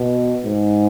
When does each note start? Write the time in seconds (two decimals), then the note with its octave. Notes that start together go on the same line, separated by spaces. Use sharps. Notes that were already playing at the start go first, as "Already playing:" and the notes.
Already playing: B2
0.45 G#2